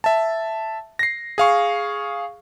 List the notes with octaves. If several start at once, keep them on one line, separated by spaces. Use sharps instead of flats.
E5 A5
A#6 C7
G#4 F5 C#6